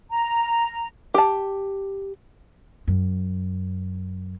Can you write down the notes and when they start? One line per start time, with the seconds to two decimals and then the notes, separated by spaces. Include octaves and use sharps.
0.10 A#5
1.14 G4 A5
2.88 F#2